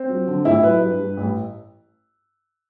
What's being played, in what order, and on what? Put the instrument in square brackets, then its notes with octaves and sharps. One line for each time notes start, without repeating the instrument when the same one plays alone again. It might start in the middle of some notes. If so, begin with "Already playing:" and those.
Already playing: [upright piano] C4
F#3
D3
A1 E4
F#3 B4
G2
G2
A1